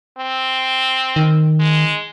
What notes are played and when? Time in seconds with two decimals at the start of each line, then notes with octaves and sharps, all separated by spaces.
0.18 C4
1.16 D#3
1.60 G#3